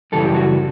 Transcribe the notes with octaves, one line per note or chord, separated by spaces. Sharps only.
F#2 C#3 E3 G3 A4
G4
F#4